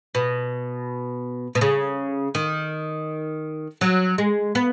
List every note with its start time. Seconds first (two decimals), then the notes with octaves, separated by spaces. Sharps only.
0.15 B2
1.55 B2
1.61 C#3
2.35 D#3
3.81 F#3
4.18 G#3
4.55 B3